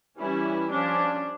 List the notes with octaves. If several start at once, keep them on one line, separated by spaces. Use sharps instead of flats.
E3 G3 C#4 E4
F3 C#4 D4